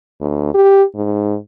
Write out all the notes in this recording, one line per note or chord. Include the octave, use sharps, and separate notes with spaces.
D2
G4
G#2